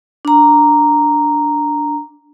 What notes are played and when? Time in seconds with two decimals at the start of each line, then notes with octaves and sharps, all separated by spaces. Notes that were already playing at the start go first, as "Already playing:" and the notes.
0.25 D4 A#5